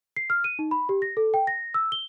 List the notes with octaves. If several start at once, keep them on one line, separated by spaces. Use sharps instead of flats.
C7
F6
D#7
D#4
B5
G4
A#6
A4
G5
A#6
E6
G7